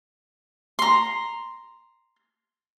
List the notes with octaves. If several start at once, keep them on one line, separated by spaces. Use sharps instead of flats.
A#5 C6